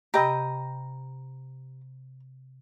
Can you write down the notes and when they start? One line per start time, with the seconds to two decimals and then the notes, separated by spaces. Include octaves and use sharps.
0.14 C3 G4 D#5 A#5 B5 G6